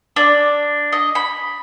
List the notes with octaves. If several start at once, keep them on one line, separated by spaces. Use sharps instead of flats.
D4
D#5
B5